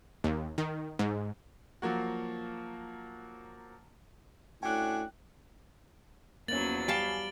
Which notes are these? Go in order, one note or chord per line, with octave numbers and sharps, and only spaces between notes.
D#2
D#3
G#2
F3 F#3 A#3 F#4
A2 C#4 D4 F#4 G5 F#6
E2 F3 F#3 A#3 C#4 A6 F#7
G3 F5 G#5 A5 D7 G7